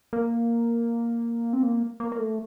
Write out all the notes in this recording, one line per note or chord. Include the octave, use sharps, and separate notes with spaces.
A#3
C4
A#3
A#3
A#3
A3